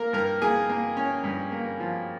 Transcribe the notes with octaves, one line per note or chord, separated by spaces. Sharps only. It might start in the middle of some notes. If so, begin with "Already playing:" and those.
Already playing: A#3 A#4
G2 A#4
A#3 G#4
A#3
C#4
G2
A#3
F3